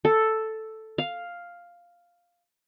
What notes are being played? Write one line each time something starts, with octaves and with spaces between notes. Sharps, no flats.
A4
F5